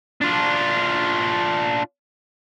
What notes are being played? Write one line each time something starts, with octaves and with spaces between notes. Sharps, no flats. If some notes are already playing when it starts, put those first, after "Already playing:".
D4 F4